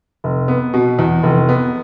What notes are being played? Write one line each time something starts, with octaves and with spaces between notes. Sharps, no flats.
F1
B3
B2
E2
F1
B3